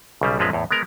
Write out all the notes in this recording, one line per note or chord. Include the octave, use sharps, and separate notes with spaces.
B1 C#3 G3
A#1 F#2 F3 G#3 C4 B4
E2 A2
G#3 B3 A#4